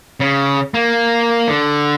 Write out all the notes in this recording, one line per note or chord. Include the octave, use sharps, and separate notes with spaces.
C#3
A#3
D3